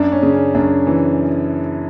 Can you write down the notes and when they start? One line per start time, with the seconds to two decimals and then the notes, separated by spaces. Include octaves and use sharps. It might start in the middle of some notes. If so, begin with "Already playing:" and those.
Already playing: F#2 D4
0.12 C#4
0.22 C#3
0.33 C#4
0.55 F#2 D4
0.87 E3